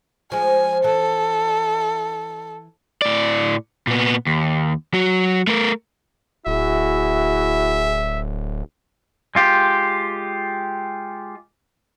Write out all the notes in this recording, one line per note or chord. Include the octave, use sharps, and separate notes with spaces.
F3 G#3 G#5
E3 A4
A2 D5
A#2 B3
D#2
F#3 F#4
A3 A#4
D1 E4 F#4 G#4 E5
G#3 F4 G4